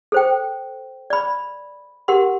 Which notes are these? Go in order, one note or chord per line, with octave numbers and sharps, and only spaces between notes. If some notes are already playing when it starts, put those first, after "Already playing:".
A4 C5 G5
D5 B5
G4 A#4 F#5 C6